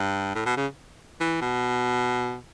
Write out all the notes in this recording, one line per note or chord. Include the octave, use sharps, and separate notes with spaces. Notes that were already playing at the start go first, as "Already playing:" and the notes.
Already playing: G2
A2
B2
C#3
E3
B2